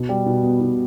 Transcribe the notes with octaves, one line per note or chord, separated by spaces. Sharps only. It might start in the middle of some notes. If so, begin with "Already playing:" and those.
Already playing: B2
G3
B2
B3
B2